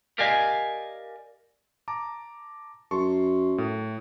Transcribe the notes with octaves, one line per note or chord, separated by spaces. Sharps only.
G4 A#4 D5 D#5 F5 G#5
A5 A#5 D6
F#2 A5 C6 C#6
A2